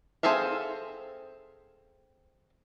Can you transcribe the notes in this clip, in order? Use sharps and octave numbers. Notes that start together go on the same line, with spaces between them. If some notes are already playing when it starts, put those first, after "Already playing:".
C4 G#4 A4 E5 F5